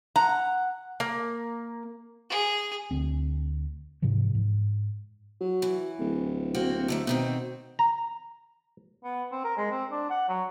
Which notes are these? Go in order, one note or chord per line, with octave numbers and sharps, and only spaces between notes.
F#5 A#5
A#3
G#4
D2 C4
G#2 C3 E3 F3
G#2
F#3
E3
D1
A#3 C4 F#4
D3 D#3 A3
B2 D#3 C4
A#5
B3
C4
A#4
G#3
C4
D4
F#5
F#3